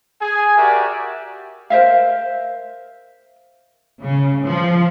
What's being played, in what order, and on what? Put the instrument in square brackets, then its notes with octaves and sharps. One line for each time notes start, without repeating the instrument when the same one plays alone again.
[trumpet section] G#4 G#5
F#4 G4 A#4 D5 E5
[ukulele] A#4 C5 E5 F5
[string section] C#3
F3